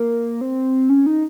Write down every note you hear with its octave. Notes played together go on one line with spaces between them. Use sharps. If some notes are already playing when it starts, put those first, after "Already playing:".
Already playing: A#3
C4
C#4
D#4